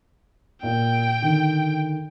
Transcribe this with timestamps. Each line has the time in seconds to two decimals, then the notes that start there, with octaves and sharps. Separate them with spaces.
0.63 A#2 G5
1.22 D3 D#3